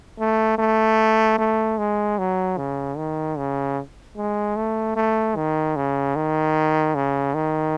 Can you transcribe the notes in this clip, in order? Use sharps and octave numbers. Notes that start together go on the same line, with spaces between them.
A3
A3
A3
G#3
F#3
C#3
D#3
C#3
G#3
A3
A3
D#3
C#3
D#3
C#3
D#3